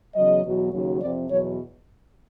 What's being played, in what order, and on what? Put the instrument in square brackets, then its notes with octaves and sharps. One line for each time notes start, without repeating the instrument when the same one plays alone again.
[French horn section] E2 C#3 F#3 D#5
E2 B2 F#3
D#2 C#3 F#3
F2 C3 F3 D5
E2 B2 F#3 C#5